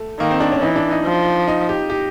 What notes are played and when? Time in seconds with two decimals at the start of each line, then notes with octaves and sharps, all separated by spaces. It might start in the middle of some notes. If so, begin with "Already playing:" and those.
Already playing: A3
0.20 D#3 A#3
0.31 C4
0.40 D4
0.52 C#4
0.62 E3 D#4
0.76 D4
0.91 D#4
1.04 F3
1.48 D#4
1.69 G4
1.90 G4